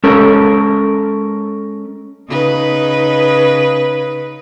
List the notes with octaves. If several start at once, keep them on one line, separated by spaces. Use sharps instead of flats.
G#3 C#4 A4 A#4
C#3 D#4 B4